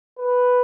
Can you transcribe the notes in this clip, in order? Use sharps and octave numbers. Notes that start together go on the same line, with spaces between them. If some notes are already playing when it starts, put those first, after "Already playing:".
B4